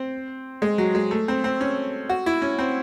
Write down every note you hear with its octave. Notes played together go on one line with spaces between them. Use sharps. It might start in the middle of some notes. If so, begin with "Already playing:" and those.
Already playing: C4
G#3
F#3
G#3
A3
C4
C4
C#4
F#4
E4
C#4
C4